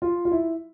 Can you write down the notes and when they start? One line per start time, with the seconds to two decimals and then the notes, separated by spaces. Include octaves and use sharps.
0.02 F4
0.25 F4
0.32 E4